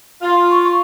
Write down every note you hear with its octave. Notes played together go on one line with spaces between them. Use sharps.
F4
C#6